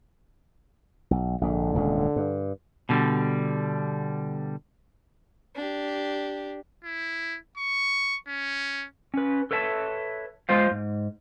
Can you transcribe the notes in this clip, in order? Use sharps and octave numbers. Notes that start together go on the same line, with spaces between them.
B1
A#1 G#2 D3
D#1 C#2 G#2
G2
B2 D3 G3
D4 G4
E4
C#6
C#4
C#4 B4
A4 B4 C#5 E5 A5
G#3 F4 C5 F5
G#2